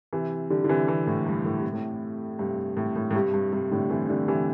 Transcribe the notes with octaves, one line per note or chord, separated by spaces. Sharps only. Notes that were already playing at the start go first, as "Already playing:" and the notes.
C3 E3
D3 G3
D3
C3 E3
C3 E3
A2
G2
A2
C3
A2
G2 C3
A2
A2
A2
G2 C3
G2
G2 C3
A2 D3
C3 E3
D3 G3
C3 E3